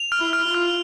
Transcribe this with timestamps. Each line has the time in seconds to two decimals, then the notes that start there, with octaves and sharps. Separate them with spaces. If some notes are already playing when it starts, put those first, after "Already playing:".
Already playing: F7
0.12 F6
0.19 E4
0.33 F6
0.48 F4
0.54 F6